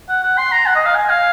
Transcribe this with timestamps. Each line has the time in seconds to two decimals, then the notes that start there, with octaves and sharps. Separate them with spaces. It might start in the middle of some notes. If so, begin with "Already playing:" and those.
0.09 F#5
0.23 F#5
0.38 C6
0.52 A#5
0.66 F#5
0.75 D#5
0.86 F5
0.95 G#5
1.10 F5